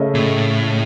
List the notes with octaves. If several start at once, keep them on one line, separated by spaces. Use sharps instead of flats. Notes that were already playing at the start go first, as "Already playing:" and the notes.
Already playing: C#3 A3 C#4 A4 D#5
A#2
A2